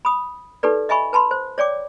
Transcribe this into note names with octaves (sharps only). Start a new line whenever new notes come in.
B5 D#6
D#4 G4 A4 B4 D5
D#5 E5 G#5 B5 C#6
B4 A5 B5 C6
C5
C#5 D5 G5 D6